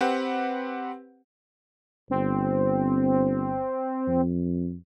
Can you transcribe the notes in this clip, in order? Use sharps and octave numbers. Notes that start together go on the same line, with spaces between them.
C4 G4 B4 F#5
G1 C4
F2